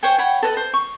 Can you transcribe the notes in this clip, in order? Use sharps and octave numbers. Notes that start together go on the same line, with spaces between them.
C5 C#5 G5 G#5
C#5 F#5 G5 B5
A4 B4 D#5
C5
C#6